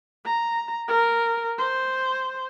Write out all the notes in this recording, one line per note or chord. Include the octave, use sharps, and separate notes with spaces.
A#5
A#4
C5